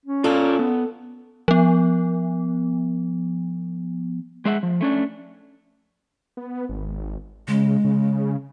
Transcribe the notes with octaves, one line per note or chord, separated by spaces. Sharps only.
C#4
F4 A4 D5 F5
B3
F3 B3
G#3 G#4 E5 F#5
F3
A3 C#4 D4
B3
G#1
C#3 G#3
C#3